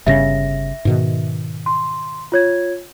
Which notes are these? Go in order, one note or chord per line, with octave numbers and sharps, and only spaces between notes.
G1 G2 C#3 E5 A#6
G#2 B2 D#3
C6
F4 C#5 G#6